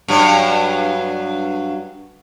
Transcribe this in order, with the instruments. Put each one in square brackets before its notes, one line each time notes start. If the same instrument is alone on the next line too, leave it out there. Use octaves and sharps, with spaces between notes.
[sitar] G2 F#3